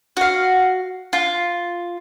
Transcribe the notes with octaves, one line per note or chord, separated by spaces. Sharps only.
F#4 F5
F4